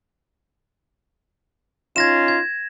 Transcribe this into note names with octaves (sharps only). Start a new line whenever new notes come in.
C#4 D#4 F4 G#6 A#6 E7
G#6